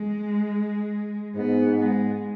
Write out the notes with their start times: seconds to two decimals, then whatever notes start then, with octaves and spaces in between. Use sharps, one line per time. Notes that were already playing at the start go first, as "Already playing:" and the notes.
Already playing: G#3
1.36 G#2 B3
1.78 G#3